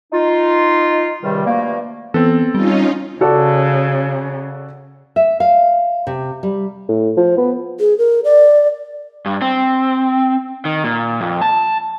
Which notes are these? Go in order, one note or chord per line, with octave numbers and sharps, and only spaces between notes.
D#4 F4
C#2 C3 D#3 G3
G2 B2 F3 A3 A#3
E3 B3 C4 A4
G3 C#4 D#4 F4
C#3 F#4 A4 D5
E5
F5
C3
G3
A2
F3
B3
G#4
A#4
D5
G2
C4
D#3
A#2
F2
A5